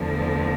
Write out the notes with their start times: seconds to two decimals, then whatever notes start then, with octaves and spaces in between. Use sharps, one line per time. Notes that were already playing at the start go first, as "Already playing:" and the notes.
Already playing: E2 D3 F3 A3